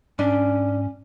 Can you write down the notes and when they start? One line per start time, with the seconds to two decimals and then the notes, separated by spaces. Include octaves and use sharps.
0.19 G#2 C#4 D4